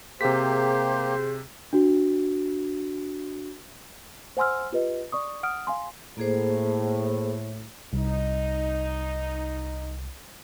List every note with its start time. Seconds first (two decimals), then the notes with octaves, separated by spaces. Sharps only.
0.21 C3 A#3 G4 G#4 C5 B6
1.73 D4 F#4
4.37 C5 F#5 G#5 C6 E6 F6
4.72 F4 G4 B4 D#5
5.12 D5 C#6 D#6
5.43 F#5 D#6 F6 D7
5.67 F5 G#5 C6
6.18 A2 A#3 G#4 C5
7.93 C2 D#4